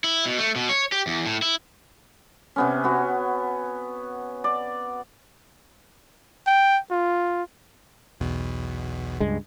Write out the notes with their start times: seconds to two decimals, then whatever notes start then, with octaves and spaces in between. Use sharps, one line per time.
0.04 E4
0.26 B2
0.39 A3
0.56 B2
0.69 C#5
0.92 G4
1.07 E2
1.26 A2
1.42 E4
2.56 C3 B3 C#4
2.84 B3 F#4
4.44 D5
6.47 G5
6.91 F4
8.20 B1 E2 B2
9.20 C#2 G2 G#3